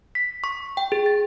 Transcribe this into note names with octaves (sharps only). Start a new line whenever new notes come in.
B6
C#6
G5
G#4
A6